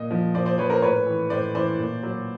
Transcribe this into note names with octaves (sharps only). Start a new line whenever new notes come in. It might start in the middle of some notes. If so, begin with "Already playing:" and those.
Already playing: A#2 D#5
F3
A#2 C5 D5
C5 D5
F3 B4 C#5
A#4 C5
A2 B4 C#5
E3
A2 C5 D5
E3 C5 D5
A#2
F#3